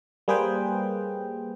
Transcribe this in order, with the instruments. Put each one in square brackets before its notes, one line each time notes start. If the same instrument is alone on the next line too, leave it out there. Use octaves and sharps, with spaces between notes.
[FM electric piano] G3 A#3 G#4 B4 C5 G5